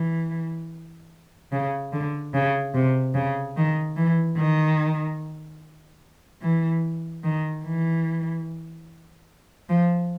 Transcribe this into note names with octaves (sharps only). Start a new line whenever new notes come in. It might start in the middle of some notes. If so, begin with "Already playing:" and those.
Already playing: E3
C#3
D3
C#3
C3
C#3
D#3
E3
D#3
E3
D#3
E3
F3